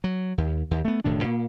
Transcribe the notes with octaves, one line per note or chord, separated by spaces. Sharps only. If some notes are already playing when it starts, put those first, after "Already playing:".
F#3
D#2
D#2
A3 B3
E1 A2 D#3 D4
A#2 A#3